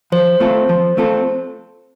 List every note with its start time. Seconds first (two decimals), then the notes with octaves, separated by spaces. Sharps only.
0.12 F3 C5
0.40 A3 C4 F4 A4
0.69 F3
0.97 A3 C4 F4 A4